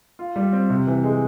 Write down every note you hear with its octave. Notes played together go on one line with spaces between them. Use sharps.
F4
G3
C4
C3
E3
G#3